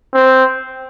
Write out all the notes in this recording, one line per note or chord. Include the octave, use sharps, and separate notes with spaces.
C4